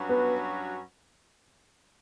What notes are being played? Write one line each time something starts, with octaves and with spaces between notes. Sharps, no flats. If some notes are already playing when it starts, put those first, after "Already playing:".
Already playing: G2 F#3 C#4 F#4 B4
B3